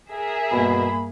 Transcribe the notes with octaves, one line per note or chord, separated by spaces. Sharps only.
G#4 A#4 E5
G2 B2 A#3 B5